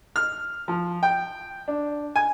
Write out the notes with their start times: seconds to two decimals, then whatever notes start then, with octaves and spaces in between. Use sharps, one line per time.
0.16 F6
0.68 F3
1.03 G5
1.68 D4
2.16 G#5